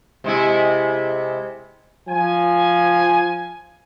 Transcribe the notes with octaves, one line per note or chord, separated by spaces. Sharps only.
C3 G#3 E4
F3 G#5